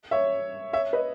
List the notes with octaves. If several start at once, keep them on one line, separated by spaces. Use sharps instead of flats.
C#5 E5
C#5 E5
B4 D#5